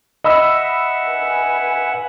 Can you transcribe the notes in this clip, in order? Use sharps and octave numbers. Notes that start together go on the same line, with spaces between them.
D#5 E5 F#5 B5 E6
B4 G#5